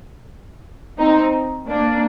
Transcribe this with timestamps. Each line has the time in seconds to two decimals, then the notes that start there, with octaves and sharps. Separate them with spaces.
0.98 C4 D#4
1.68 A#3 D4